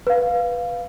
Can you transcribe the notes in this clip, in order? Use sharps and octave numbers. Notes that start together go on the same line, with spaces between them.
B4 F5